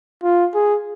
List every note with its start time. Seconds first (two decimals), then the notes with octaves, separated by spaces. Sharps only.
0.23 F4
0.55 G#4